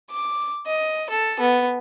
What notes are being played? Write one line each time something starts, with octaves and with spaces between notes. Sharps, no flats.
D6
D#5
A4
B3